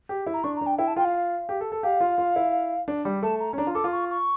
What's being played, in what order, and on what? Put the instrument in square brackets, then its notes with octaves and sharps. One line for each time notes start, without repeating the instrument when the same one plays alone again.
[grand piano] G4
E4
[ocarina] A#5
[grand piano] D4 [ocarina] C#6
[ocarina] A#5
[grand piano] D4
[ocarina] G5
[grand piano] E4 [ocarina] G5
[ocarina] A5
[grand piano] F4 [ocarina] G5
[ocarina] F5
[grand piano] G4
A4
A4
[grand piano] G4 [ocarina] F5
[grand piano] F4
F4
E4
D4
G3
[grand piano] A3 [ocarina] A5
[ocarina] A#5
[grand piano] C#4
[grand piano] D4 [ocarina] A#5
[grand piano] F4
[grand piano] A4 [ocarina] D6
[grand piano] F4
[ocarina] C#6
C#6